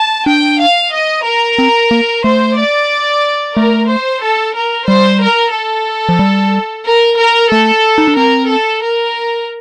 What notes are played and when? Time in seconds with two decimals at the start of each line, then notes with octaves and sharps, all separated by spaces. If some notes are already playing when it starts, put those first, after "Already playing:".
Already playing: A5
0.26 D4 G5
0.59 F5
0.92 D#5
1.25 A#4
1.58 C4
1.91 A#3
2.24 A3 C5
2.57 D5
3.55 A3 A#4
3.89 C5
4.22 A4
4.54 A#4
4.87 G3 C5
5.21 A#4
5.54 A4
6.09 F3
6.19 G3
6.85 A#4
7.19 A#4
7.51 A3 A4
7.98 D#4
8.07 D4
8.17 C4 A#4
8.50 A4
8.84 A#4